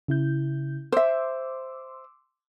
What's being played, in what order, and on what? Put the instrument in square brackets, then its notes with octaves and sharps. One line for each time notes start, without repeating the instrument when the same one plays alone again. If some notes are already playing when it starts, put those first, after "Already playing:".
[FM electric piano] C#3 E4 G6
[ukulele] C5 E5 [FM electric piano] C6 D6 E6